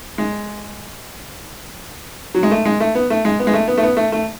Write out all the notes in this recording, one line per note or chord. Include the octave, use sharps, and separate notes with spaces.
G#3
F#3
G#3
A3
G#3
A3
B3
A3
G#3
B3
G#3
A3
B3
A3
B3
A3
A3